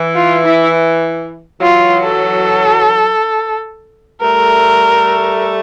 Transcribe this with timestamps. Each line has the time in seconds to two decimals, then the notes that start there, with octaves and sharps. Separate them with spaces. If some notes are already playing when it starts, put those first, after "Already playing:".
Already playing: E3
0.15 F4
0.45 E4
1.61 E3 F#3 F4
2.04 A4
4.22 G3 A3 A#4